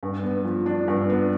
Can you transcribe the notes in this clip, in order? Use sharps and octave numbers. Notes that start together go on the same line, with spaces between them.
G2
B3
F3
D4
G2
B3